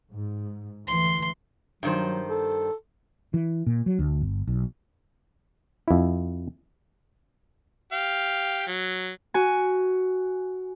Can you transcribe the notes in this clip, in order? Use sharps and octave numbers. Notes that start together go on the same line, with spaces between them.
G#2
D2 E3 C6
G2 D#3 F#3 C5
A4
E3
A#2
F#3
D2
G1
B1
F2 E4
G4 F5
F#3
F#4 G#5